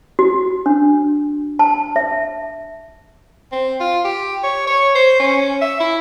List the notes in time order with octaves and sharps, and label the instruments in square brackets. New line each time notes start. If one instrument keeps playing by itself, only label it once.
[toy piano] F#4
D4
A5
E5
[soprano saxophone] C4
F4
G4
C#5
C#5
C5
C#4
E5
E4